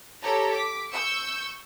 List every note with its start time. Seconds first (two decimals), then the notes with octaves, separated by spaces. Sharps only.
0.22 G4 A4 C#5 A#5
0.51 D6 B6
0.91 C#6 E6 G6